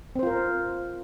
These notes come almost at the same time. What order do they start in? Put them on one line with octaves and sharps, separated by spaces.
C4 C5 F4 A#4